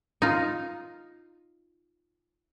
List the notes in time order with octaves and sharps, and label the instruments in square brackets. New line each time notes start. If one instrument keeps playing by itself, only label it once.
[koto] D#4 F4